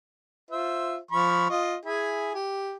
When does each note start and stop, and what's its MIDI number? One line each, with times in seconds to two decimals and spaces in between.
0.51 0.97 65
0.51 0.97 72
0.51 0.97 76
1.11 1.48 53
1.11 1.48 83
1.11 1.48 85
1.50 1.76 65
1.50 1.76 75
1.85 2.33 64
1.85 2.33 68
1.85 2.33 80
2.34 2.76 67